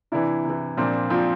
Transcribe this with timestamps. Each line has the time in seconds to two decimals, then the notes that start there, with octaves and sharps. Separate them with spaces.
0.12 C3 E3 D4 E4
0.44 C3
0.50 E3
0.77 A#2 F3 C4 D4
1.10 F3 C4 D4
1.14 A#2